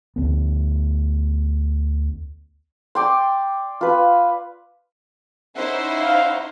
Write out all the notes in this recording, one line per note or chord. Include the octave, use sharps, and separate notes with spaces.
D2 B3
D5 G5 C6
F4 B4
C#4 D#4 E4 C5 E5 F#5
F5